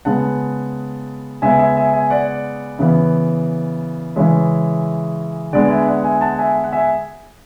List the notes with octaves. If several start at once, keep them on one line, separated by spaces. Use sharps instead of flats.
C#3 G#3 B3 F#5 A5
C#3 G#3 B3 E5 G#5
E5 G#5
E5 G#5
E5 G#5
D5 F#5
C#3 E3 B3
C#3 E3 G#3 C#5 E5
D3 G#3 B3 D5 F#5
E5 G#5
D5 F#5
E5 G#5
F#5 A5
E5 G#5
F#5
E5 G#5